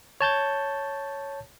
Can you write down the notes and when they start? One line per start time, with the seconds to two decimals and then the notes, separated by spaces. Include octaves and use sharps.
0.21 C#5 A5 G6 A6